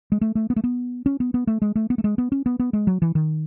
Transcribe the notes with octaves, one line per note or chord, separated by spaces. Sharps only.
G#3
A3
A3
B3
A3
B3
C#4
B3
B3
A3
G#3
A3
B3
A3
G#3
B3
C#4
B3
B3
G#3
F#3
E3
D#3